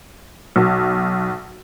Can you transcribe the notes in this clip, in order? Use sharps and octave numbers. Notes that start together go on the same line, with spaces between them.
B1